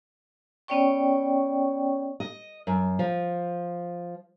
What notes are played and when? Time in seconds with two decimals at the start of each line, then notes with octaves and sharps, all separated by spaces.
0.68 B3 C#4 C#5 D5 G5 C#6
2.20 D#5
2.67 F#2
2.99 F3